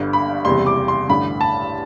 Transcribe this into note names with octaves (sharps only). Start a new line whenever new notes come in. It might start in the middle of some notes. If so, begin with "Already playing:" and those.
Already playing: G1 G2 D3
B5
F#1 E2 C3 G3 C6
D6
C6
A1 G2 D3 B5
A5